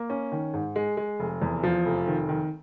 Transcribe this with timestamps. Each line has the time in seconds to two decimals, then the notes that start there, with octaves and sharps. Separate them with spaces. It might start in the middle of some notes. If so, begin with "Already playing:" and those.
Already playing: A#3
0.10 C#4
0.32 D#3
0.54 G#2
0.76 G#3
0.97 G#3
1.20 F1
1.42 E2
1.63 F3
1.86 F1
2.07 D#3
2.29 D#3